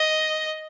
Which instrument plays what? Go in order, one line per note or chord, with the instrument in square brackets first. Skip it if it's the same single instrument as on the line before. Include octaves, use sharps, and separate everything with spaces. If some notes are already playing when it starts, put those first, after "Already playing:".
Already playing: [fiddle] D#5